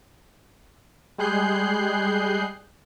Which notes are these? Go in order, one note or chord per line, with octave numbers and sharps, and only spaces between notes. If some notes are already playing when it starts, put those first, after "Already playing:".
G3 G#3 G#4 F#6 G6 C7